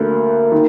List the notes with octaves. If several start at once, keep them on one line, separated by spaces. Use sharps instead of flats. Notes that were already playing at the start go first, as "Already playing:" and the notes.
Already playing: D2 D3 A#3
D#3